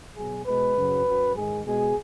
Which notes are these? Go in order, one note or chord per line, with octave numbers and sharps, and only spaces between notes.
B2 F#3 G#4
B2 G#3 B4
F#2 C#3 F#3
F#2 F#3
G#2 D#3 G#3 G#4
B2 G#3 G#4